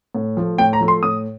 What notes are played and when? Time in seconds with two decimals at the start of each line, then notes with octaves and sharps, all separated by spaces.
0.15 A2
0.37 F3 A3
0.58 A2 G5
0.73 A#5
0.81 F3 A3
0.88 C6
1.03 A2 D#6